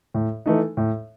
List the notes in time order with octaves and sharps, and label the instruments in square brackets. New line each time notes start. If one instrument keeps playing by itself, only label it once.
[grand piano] A2
E3 A3 D#4
A2